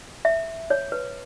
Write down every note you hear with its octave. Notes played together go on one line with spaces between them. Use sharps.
E5
C#5
B4